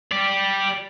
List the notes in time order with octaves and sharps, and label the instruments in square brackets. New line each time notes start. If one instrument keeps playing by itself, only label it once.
[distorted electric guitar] G4 D5